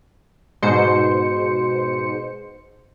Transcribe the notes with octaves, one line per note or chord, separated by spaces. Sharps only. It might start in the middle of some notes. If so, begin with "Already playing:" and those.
G#2 B2 C5 C#7